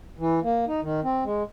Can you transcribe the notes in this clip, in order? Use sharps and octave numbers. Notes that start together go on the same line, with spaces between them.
E3
A#3
D#4
D#3
C4
G#3